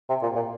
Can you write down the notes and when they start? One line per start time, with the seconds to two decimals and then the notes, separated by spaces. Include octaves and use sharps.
0.09 C3
0.22 A#2
0.35 A#2